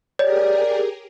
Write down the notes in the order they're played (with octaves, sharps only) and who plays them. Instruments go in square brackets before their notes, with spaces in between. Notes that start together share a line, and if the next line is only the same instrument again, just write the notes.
[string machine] G4 G#4 A#4 [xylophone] C#5 [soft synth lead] D5